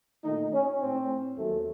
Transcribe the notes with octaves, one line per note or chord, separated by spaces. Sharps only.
A#2 D#3 A3 D#4
C#4
A2 A3 C4
D#2 D#3 F#3 A3